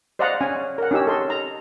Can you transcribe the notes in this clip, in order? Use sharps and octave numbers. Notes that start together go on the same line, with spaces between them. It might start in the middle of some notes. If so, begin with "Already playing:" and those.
C5 D5 D#5 F5 F#5 A#5
C#4 G#5
A#4 F#5
C#4 D#4 G4 E6
A4 D#5 C6
A#5